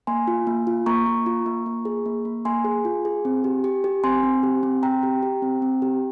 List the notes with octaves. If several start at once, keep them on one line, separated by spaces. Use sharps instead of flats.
A#3 G#5 C6
F4
A#3
F4
A#3 A#5 C#6
A#3
F4
A#3
A#3
G#4
A#3
A#3
A#3 G#5 C6
G#4
F4
G#4
C4
G4
G4
G4
C4 G#5 C6
C4
G4
C4
C4 G5 A#5
G4
G4
C4
C4
G4